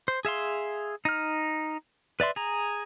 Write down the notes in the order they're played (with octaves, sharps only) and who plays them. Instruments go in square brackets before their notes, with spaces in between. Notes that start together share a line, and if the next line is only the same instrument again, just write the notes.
[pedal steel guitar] C5
G#4 E5 F5 C6
D#4 F6
B4 D5 E5 C6
G#4 A#5